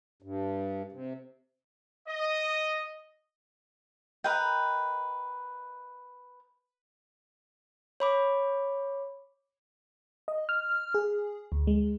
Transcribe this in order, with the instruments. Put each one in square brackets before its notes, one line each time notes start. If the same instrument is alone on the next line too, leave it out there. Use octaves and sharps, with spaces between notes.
[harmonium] G2
C3
[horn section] D#5
[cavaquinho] A#4 B4 D#5 G5
[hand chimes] C#5 B5 D6
[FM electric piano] D#5
F6
G#4
D2
G#3